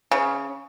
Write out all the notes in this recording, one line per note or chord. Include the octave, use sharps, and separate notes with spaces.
C#3